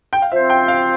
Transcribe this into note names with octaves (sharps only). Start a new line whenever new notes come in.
G5
F5
F3 C4 F4 C5 E5
G5
F5